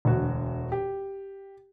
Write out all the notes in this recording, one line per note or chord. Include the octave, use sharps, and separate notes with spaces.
E1 D2 F#4
G4